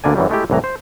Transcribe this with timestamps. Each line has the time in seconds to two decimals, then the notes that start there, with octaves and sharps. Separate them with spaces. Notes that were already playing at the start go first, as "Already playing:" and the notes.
0.04 D2 D3 A#3 D5 G#5
0.16 F#2 E3 F#3 G3
0.29 G#3 A3 E4 G4
0.50 C2 A2 E3 A#5
0.64 C5